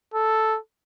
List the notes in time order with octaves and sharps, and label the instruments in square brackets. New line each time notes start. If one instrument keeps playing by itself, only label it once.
[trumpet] A4